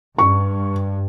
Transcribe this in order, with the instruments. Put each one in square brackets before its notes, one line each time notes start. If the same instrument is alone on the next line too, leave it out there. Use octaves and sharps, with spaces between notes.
[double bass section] G2 [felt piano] C#6